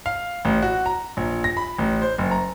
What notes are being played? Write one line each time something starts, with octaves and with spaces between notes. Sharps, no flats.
F5
A1
F#4
A#5
A#1
A#6
B5
A1
C5
F#1
A#5